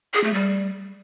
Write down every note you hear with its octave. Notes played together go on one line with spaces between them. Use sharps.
G#4
A3
G3